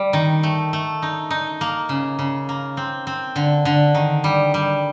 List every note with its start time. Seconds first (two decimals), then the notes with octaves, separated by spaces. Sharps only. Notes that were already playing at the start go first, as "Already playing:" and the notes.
Already playing: G3
0.13 D#3
0.43 A3
0.73 A3
1.02 D#4
1.30 D#4
1.61 A#3
1.89 C#3
2.19 C#3
2.49 A#3
2.77 C4
3.07 C4
3.36 D3
3.65 D3
3.95 D#3
4.24 G3
4.54 G3